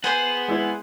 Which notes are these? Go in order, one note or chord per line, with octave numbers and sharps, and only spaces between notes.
B3 G#4 C5 G#5
G#3 E4 D5